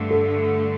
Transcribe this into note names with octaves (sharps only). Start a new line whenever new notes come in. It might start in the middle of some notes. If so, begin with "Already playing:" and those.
Already playing: G2 D3 A3
A4